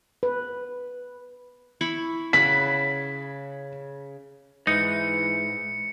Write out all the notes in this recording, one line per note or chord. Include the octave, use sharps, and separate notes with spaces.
B4
E4 B5 C#6
C#3 F#5 B5 B6
G#2 E3 D#4 C#7